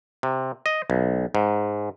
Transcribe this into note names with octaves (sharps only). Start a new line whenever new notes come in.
C3
D#5
B1
G#2